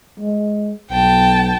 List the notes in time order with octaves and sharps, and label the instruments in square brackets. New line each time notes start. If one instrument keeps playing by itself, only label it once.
[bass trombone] G#3
[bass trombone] B1 [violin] G5 A5